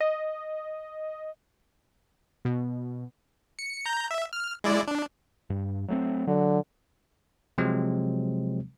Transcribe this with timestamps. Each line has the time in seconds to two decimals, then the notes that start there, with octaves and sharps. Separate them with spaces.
0.01 D#5
2.45 B2
3.59 C#7
3.86 A#5 G6
4.11 E5
4.33 F6
4.64 G#3 E4 D5
4.87 D4
5.50 G2
5.88 F#3 A3 C4
6.27 D3 F#3
7.58 C3 F3 F#3 G#3 C4